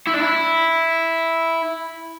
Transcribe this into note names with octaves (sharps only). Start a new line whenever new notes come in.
E4
D4
E4